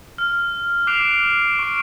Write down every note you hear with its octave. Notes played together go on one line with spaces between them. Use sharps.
F6
D6 F#6 C7 D7 F7
C#6 D7